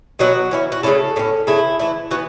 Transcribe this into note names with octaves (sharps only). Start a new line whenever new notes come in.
B2 F#3 B3 F#4
E3 C#4 E4
F#4
C#3 A3 C#4 E4 A4
A2 A3 C#4
C#3 E3 A3 E4
E3 A3 E4
E3 B3 F#4